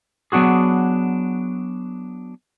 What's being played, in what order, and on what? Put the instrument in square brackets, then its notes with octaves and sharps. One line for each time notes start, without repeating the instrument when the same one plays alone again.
[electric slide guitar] F#3 B3 D4 F#4 G#4